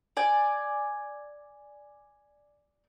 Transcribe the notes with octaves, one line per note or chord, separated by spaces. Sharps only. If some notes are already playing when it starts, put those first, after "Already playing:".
D5 G#5